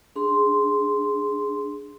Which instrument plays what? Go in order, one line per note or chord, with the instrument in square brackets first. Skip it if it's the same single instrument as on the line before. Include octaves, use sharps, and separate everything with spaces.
[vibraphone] D4 G#4 C6